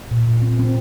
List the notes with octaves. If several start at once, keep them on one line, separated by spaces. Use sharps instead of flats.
A#2
C4
C4